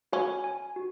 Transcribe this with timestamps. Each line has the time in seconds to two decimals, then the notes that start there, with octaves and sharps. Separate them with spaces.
0.13 C#4 F#4
0.44 G#5
0.76 F#4